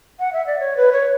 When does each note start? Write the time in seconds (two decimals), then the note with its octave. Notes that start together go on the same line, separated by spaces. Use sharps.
0.20 F#5
0.33 E5
0.47 D5
0.60 C#5
0.77 B4
0.93 C#5